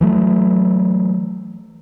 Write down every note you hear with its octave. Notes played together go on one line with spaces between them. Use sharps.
E3 F#3 A3